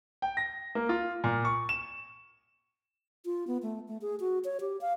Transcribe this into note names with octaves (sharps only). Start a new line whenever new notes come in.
G5
A#6
A#3
F4
A#2
C#6
E7
F4
B3
A3
A3
G#4
F#4
C#5
G4
F5